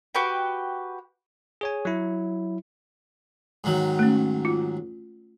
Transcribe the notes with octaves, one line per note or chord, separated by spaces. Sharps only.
F#4 G4 B4 G5
G#4 C#5 G#5
F#3 E4
G#2 D#3 F#3
A3 C#4
F4